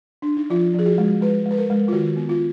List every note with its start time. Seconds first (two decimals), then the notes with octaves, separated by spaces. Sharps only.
0.22 D4
0.37 D#4
0.50 F3 F4
0.74 F3 G#4
0.86 F#4
0.98 G#3
1.21 G#3 B4
1.46 G#3
1.51 B4
1.58 A#4
1.70 G#3
1.88 F4
1.93 D#3 F#4
2.17 B3
2.29 F4